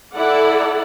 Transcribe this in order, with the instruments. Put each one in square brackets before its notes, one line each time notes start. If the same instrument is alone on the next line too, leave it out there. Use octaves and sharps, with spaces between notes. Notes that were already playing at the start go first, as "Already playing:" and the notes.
[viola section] E4 A4 D5 F#5